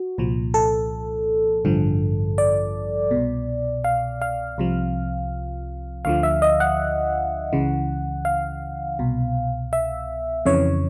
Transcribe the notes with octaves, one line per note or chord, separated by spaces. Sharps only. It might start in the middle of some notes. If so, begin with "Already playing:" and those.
Already playing: F#4
C2 A#2 F3
A4
A1 G2 D3 F3
D5
C2 B2
F5
F5
C2 C3 F3
D2 D3 F3 F5
E5
D#5
F#5
C#2 C#3 E3
F5
C2 B2
E5
F2 C#3 E3 C#5